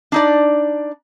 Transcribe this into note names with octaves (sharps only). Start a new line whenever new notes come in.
D4 D#4 D5